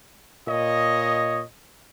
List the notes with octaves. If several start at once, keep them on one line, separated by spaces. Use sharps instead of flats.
A#2 C#5 D#5